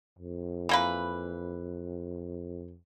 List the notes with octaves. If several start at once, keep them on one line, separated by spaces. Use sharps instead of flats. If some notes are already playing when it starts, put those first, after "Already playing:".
F2
E3 A#3 B4